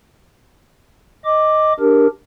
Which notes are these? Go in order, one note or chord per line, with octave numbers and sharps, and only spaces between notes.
D#5 D6
D4 G4 A#4